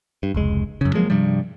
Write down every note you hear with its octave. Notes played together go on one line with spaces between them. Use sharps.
G2
F1 C#2 G#3
F#2 C#3
F3 F#3 G#3 A#3
G2 C3 F3 G3